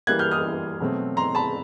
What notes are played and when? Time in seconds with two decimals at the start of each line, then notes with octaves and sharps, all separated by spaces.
0.07 E3 G3 A#3 F#6 G#6
0.19 F6 G6
0.31 D#6 F6
0.80 B2 F#3 A3 C4
1.17 A#5 C6
1.35 A5 B5